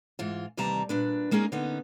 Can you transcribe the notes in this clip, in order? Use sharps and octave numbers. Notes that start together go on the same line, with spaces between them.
G#2 E3 F4
D#2 C3 E3 G3 A5 A#5
A#2 D4 B4
G#3 A#3 C#4 D#4 G#4
D3 B3 C#4 D#4